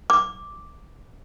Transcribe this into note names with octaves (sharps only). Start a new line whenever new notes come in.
D6